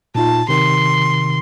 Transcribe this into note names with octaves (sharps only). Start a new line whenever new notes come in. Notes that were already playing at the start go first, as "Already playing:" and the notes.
A#2 D#4 F4 A5
C3 D#3 C6